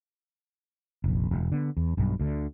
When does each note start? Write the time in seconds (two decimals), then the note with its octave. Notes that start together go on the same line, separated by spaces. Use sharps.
1.04 F1 A#1
1.31 E1
1.52 D3 B3
1.77 E2
1.97 B1 G2
2.20 D2 D3